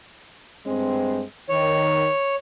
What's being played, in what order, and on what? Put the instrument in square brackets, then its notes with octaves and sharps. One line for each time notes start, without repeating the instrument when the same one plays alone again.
[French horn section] G2 G#3 C4
[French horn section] D#3 [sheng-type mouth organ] C#5